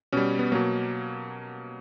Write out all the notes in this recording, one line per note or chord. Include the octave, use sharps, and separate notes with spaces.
B2 G3 C#4
B3
B2 F#3 A#3